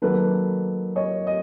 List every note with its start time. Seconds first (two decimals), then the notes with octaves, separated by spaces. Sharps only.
0.02 D#3 F#3 A#3 A4 B4
0.96 C#5 D#5
1.27 D#5